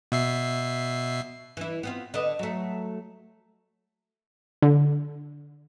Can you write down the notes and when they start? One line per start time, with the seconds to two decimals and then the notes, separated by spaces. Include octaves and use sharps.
0.12 B2 E5 C7
1.57 E3 E4
1.83 B3 C4 F4
2.14 D3 B4 D#5
2.39 F#3 A3
4.62 D3